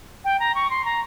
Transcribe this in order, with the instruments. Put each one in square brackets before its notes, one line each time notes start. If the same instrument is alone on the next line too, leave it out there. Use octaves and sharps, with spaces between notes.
[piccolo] G5
A#5
C#6
C6
A#5